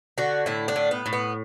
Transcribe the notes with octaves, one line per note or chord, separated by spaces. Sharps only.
D3 F#4
A2 E4
D4
A2
B3
A2
B3